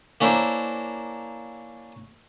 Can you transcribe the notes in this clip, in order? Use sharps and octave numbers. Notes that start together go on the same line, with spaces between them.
A#3 C#4 D4 E4 A#4 C5